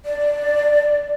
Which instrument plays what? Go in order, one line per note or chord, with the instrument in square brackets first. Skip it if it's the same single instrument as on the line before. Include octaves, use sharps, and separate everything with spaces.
[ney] D5